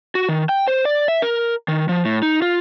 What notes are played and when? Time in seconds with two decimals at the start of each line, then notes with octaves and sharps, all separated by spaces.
0.15 F#4
0.29 D#3
0.49 G5
0.67 C5
0.85 D5
1.08 E5
1.22 A#4
1.68 D#3
1.89 F3
2.05 A2
2.22 D#4
2.42 F4